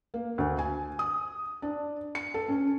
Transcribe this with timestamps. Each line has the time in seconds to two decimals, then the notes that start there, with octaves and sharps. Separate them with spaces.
0.14 A#3
0.38 D2
0.59 G#5
0.99 D#6
1.62 D4
2.15 C#7
2.34 A4
2.48 C#4